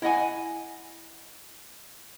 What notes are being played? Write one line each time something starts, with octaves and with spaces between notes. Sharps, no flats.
E4 D#5 F#5 G#5